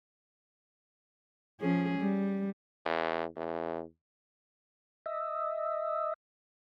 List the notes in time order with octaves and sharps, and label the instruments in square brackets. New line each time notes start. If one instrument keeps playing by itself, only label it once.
[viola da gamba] F3 C#4 G#4
G3
[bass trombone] E2
E2
[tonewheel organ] D#5 E5